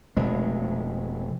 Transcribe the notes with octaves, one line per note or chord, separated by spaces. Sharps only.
F1 B2 G#3